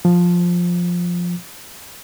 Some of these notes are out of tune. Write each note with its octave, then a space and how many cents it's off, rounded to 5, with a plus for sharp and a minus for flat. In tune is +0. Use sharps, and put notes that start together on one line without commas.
F3 +10